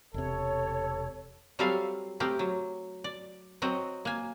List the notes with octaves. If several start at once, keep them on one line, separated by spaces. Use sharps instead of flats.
E1 C3 A4 C#5
F#3 G3 C4 A4 E5 F5
A3 C4 G4 A#4
F#3
D5
F#3 C4 F#4 D#5
A#3 G#5